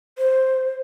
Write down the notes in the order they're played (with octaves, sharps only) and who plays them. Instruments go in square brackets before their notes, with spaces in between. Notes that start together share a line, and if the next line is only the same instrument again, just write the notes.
[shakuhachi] C5